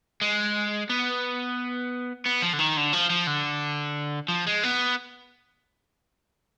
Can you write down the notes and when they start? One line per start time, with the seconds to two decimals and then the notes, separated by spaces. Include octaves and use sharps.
0.22 G#3
0.89 B3
2.26 B3
2.42 F3
2.53 D3
2.59 D#3
2.77 D3
2.93 F3
3.10 F3
3.27 D3
4.28 F3
4.47 G#3
4.63 B3